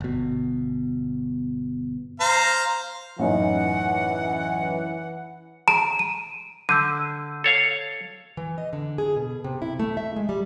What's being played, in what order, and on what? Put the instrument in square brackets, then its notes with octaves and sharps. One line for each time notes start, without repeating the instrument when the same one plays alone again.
[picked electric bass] G1 B2
[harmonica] C5 F5 A#5
[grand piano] A1 F#2 D#4 [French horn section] E3 [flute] F#5
[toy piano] A#5 [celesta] D7
[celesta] D#7
[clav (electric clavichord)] D3 [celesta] E6 G6 D#7
[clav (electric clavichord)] A4 C#5 F5
[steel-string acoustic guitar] E3
D#5
D3
G#4
B2
C3
E4
A3
E5
G#3
G3